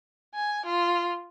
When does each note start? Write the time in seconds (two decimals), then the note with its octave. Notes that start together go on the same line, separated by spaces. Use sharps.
0.34 G#5
0.66 F4